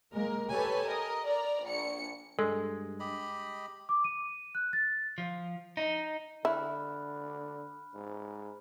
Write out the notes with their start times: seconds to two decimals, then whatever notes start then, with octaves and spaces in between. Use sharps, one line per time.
0.13 G#3 A#3 A#4
0.52 G4 A4 B4 C#5 G#5 A5
0.88 A#4 D#5
1.27 A#4 D5 A#5
1.64 A#1 C#7
2.39 G2 G#3 A4
3.00 G4 D#5 B5
3.89 D6
4.04 D#7
4.55 F#6
4.73 A6
5.18 F3
5.77 D#4
6.45 D3 E4 B5 F6 F#6
7.94 G#2